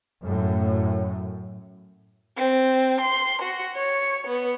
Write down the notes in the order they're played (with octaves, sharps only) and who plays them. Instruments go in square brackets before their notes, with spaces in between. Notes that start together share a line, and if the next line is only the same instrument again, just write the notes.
[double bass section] F#2 A2
[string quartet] C4
C6
F#4
C#5
B3